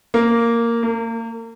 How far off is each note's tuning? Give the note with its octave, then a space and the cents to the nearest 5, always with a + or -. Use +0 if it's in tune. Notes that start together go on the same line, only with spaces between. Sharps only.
A#3 -5
A#3 -35